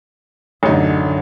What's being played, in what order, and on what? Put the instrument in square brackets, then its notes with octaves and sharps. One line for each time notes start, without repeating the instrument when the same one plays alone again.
[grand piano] A1 D#4 [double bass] F#2 D3